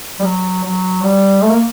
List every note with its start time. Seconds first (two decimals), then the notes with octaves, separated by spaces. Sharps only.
0.19 G3
0.24 F#3
0.64 F#3
1.03 G3
1.42 A3
1.50 A#3